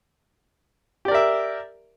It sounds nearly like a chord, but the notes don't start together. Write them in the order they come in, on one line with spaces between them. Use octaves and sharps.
G4 D5 A#4 E5